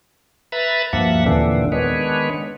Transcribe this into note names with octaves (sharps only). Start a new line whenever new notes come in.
B4 E5 A#5 B5 A6
D2 G2 F3 A#3 E5 F#5
D#2 A#2 D3 E3 C4 D4
D#3 G#3 B3 D4 B4 C#5